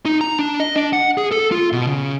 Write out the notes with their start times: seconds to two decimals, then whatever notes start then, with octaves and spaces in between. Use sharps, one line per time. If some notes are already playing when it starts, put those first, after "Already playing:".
0.05 D#4
0.21 A#5
0.39 D4
0.60 D#5
0.76 D4
0.93 F#5
1.17 G#4
1.31 A4
1.52 F4
1.72 B2
1.87 C#3